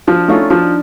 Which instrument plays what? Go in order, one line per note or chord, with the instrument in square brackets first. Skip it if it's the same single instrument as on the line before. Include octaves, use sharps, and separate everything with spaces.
[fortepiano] F3 [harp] D4
[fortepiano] A3 C#4 F4 [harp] D#4
[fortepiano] F3 [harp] D4